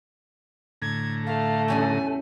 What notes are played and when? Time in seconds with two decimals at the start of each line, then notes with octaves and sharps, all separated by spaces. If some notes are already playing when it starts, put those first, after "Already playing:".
0.82 A2 D3 A#5 G#6
1.26 A3 F5
1.68 E2 C#3 G3 G#5